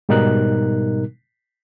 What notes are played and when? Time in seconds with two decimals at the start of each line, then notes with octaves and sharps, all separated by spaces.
0.09 G#2 B2 G3 D#4 A#4 F#6